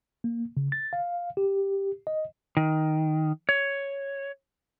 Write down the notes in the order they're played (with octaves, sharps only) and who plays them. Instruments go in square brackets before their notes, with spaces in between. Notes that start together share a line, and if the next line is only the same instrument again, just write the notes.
[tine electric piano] A#3
C#3
A6
F5
G4
D#5
[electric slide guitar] D#3
C#5